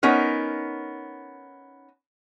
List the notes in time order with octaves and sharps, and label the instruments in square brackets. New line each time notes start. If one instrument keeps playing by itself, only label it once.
[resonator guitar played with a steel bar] B3 C#4 D#4 A#4